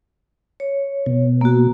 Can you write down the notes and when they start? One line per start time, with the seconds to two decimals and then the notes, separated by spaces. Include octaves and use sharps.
0.60 C#5
1.06 B2
1.41 A#3 F#4